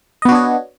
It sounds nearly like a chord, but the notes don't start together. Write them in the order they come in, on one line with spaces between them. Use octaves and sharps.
D#5 B3 F#4 D4 C#5